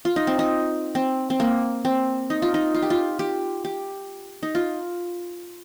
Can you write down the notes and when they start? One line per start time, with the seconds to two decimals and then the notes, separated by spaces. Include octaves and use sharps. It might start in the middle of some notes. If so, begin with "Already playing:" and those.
0.05 F4
0.16 D#4
0.27 C4
0.39 D#4
0.95 C4
1.30 C4
1.40 A#3
1.85 C4
2.30 D#4
2.42 F4
2.54 D#4
2.74 F4
2.82 G4
2.90 F4
3.19 G4
3.65 G4
4.43 D#4
4.55 F4